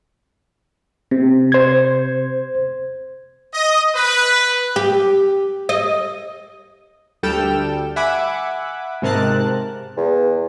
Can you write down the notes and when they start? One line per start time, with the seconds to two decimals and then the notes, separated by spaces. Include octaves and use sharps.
1.11 C3
1.52 C5 G#6
3.54 D#5
3.96 B4
4.76 G4
5.69 D#5
7.23 D2 G3 A4 G5 F6 E7
7.96 E5 F#5 G#5 B5 D6
9.02 G#2 C3 A#4 A5 F#6
9.97 E2